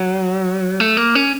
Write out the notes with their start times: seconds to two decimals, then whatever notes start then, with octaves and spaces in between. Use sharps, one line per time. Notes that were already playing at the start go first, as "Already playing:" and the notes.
Already playing: F#3
0.80 A3
0.97 A#3
1.15 C#4